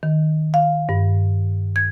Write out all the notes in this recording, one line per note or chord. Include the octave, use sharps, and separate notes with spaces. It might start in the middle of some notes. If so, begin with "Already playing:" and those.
D#3
F5
G2
G#6